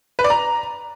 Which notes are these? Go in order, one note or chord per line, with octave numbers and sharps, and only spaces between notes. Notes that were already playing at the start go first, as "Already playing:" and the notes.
B4
D5
A#5